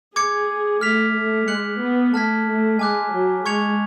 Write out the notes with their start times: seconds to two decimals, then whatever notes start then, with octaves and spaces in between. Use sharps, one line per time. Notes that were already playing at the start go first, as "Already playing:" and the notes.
0.15 G#4 D6 G#6 C#7
0.81 A3 F6 B6 F7
1.15 A3
1.48 G#3 F#6 C#7 F#7
1.80 B3
2.14 A3 A5 F6 G#6 B6
2.47 A3
2.79 G#3 G#5 D6 F#6
3.12 F#3
3.45 G#3 C#6 G#6 C#7 F7